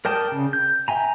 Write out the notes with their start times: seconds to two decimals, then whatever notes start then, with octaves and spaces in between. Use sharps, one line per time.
0.05 A#4 D5 G5 A5 D#6
0.31 C#3
0.53 G6
0.88 E5 G5 G#5 A#5